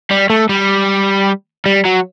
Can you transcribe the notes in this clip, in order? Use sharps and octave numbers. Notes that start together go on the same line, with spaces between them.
G3
A3
G3
G3
F#3